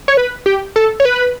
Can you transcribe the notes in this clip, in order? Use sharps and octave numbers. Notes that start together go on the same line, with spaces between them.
C#5
B4
G4
A4
C#5
B4